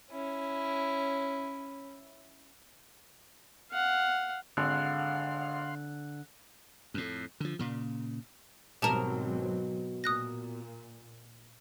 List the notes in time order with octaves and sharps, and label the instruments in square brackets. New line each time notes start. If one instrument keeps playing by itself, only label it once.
[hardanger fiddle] C#4 E4
[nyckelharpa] F5 F#5
[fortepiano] G#1 [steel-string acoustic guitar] D3 [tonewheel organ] F5 F#5 C6 [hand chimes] F#6
[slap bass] F2 A2
D3 F3
A#2 C#3
[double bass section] G#1 F#3 C4 [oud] B2 A#4 [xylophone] G4 A5 E7
[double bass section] A#2 [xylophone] D#6 F#6 A#6